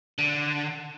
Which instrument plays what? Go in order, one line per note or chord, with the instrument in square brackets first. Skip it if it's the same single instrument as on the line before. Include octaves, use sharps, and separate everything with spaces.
[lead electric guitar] D3